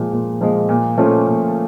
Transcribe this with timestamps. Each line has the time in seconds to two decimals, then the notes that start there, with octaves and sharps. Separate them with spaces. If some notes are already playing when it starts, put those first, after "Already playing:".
Already playing: A#2 F3 G#3
0.13 A#2
0.41 F3 G#3
0.69 A#2
0.98 F3 A3 C#4 F4
1.27 A#2